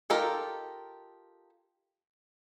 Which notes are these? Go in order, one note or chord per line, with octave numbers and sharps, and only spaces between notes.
D#4 F4 G4 A4 A#4